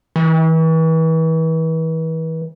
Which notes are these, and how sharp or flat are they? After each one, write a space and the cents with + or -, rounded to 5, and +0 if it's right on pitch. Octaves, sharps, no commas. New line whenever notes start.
E3 -35